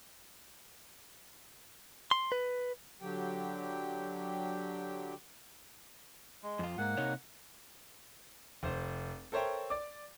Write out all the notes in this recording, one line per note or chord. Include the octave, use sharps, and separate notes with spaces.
C6
B4
D3 F#3 G4 G5
G#3
F2 F4
G#2 A#3 F#5
C3 D#4 C#5
F1 C5
A4 A#4 C5 C#5 E5 G5
D5 D6